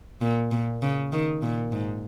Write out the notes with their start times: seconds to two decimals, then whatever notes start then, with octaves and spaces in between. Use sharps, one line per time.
0.22 A#2
0.51 A#2
0.82 C#3
1.13 D#3
1.43 A#2
1.72 G#2